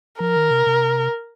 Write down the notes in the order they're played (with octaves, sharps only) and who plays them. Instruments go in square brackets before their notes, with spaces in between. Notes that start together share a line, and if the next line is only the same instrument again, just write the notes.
[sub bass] F3 [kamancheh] A#4
[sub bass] D#3
C3
C3